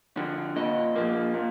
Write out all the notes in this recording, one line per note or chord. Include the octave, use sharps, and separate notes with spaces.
D3 F3
A#2 D#5
F3 A#3
A#2